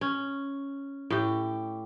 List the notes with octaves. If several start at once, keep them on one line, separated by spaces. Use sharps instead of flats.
C#4
A2 G4